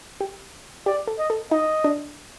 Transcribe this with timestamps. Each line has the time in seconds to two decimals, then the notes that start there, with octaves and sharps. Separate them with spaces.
0.21 G4
0.86 G4 D5
1.07 A4
1.18 D#5
1.30 A4
1.51 D#4 D#5
1.84 D4